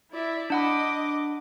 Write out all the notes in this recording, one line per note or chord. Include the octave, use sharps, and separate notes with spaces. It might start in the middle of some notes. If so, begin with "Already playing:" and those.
E4 D5 E5
D4 D#5 F#5 B5 D6